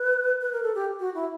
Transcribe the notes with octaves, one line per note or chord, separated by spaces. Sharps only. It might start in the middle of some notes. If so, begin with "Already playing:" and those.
Already playing: B4
B4
A#4
A4
G4
F#4
E4